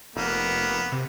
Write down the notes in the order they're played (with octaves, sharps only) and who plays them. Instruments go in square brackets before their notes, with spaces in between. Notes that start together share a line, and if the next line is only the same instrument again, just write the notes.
[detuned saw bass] F1 [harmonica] A#3 B3
[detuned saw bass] C3